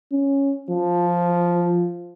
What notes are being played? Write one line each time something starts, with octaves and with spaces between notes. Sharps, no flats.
C#4
F3